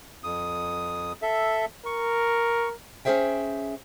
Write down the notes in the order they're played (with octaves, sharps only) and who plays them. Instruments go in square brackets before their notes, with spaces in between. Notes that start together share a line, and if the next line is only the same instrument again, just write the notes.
[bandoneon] F2 D#6
A4 E5
[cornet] A#4 [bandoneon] C#6
[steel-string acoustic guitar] C#4 E4 G#4 C5 E5 G5